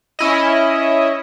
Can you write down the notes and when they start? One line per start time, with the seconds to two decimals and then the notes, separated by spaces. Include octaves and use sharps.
0.19 C#4 E4 D#5